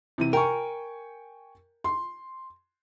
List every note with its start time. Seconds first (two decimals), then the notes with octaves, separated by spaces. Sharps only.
0.18 C3 E3 D#7
0.33 A#4 G5 G#5 C#6
1.84 C6